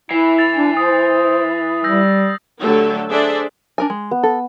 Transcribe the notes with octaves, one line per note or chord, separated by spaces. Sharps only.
E3 E4 C7
A6 F7
D4
C5 D#6
G3 E6 G6 A#6
D3 F#3 A3 G4 A4 C#5
D4 G#4 A4 C5 D5 E5
D4 A#4 G#5
G#3
B3
A4